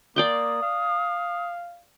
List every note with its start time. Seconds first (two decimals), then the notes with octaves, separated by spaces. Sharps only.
0.16 A#3 D5 G5 C6 D#6
0.62 F5